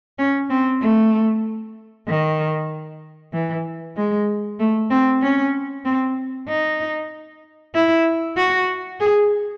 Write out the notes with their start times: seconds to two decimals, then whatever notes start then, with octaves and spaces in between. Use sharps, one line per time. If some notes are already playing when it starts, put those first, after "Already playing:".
0.19 C#4
0.50 C4
0.81 A3
2.07 D#3
3.33 E3
3.97 G#3
4.60 A3
4.90 C4
5.22 C#4
5.85 C4
6.48 D#4
7.74 E4
8.37 F#4
9.00 G#4